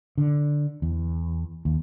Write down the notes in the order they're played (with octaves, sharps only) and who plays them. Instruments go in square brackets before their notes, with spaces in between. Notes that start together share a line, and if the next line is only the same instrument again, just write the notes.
[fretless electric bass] D3
E2
D#2